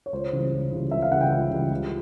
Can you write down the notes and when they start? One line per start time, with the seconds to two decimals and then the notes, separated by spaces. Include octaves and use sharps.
0.06 C#5
0.12 C#2 C5
0.33 C#3 E3 G3
0.53 C#2
0.72 C#3 E3 G3
0.91 C#2 E5
1.02 F5
1.12 C#3 E3 G3 F#5
1.21 G5
1.32 C#2
1.51 C#3 E3 G3
1.71 C#2